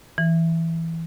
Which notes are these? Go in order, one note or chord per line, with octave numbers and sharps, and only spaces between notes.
E3